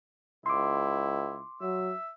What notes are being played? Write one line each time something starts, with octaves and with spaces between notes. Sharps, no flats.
C#2 E4 C6 D6
F#3 E5